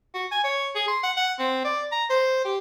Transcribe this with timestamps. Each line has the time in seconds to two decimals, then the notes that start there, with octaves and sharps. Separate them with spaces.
0.14 F#4
0.32 G#5
0.44 C#5
0.76 G#4
0.88 C6
1.03 F#5
1.17 F#5
1.39 C4
1.65 D5
1.92 A#5
2.10 C5
2.45 G4